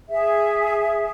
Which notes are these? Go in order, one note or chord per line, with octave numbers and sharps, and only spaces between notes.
G#4 E5